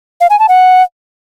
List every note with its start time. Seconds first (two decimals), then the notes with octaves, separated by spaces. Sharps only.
0.21 F5
0.30 G#5
0.39 A5
0.49 F#5